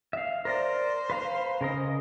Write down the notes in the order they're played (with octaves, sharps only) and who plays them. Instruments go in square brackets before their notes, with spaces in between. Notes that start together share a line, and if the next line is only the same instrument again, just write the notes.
[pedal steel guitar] E5 F5
[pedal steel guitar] A#4 D5 A#5 [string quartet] C5
[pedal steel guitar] B4 F5 A#5
C#3 A#4 D#5